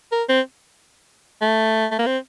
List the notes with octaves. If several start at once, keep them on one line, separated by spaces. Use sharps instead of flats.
A#4
C4
A3
A3
A#3
C4